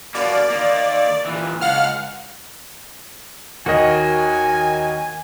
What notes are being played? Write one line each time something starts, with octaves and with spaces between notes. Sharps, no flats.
B2 A#3 D5
D#3 A#3
A#2 E3
C#2 F5 F#5 F6
D#2 D#3 F#4 A#4 D#5 G#5